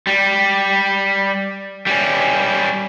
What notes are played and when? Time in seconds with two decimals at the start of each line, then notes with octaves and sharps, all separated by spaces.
0.07 G3
1.87 G3 C#4